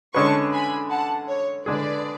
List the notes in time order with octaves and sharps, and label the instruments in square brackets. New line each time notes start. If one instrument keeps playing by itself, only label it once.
[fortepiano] D3 G#3 C#4 G#4 B4 [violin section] A5 C#6
[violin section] G#5 B5
F#5 A5
C#5
[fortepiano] D3 G#3 D4 G#4 [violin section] B4 D5